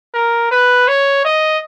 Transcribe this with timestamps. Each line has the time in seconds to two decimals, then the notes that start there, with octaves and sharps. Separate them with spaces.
0.14 A#4
0.51 B4
0.88 C#5
1.25 D#5